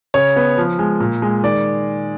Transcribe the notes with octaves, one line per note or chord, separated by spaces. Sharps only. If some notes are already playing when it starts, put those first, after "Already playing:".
C#3 C#5
B3
F3
G#3
A#2
G#3
D#3 D5